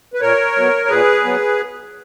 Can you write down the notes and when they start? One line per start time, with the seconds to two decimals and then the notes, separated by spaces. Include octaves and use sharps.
0.13 B4
0.21 A#2 A#4 C#5
0.56 F#3 B3
0.85 C#5
0.89 A#2 G#4 B4
1.24 F#3 B3